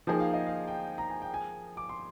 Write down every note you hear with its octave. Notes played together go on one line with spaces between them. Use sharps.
F3 A#3 D#4 G#4 G5
F5
D#5
F5
G5
A#5
G#5
G5
G#5
D6
C6